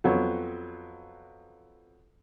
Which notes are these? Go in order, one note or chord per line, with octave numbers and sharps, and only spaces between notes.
F2 F#3 B3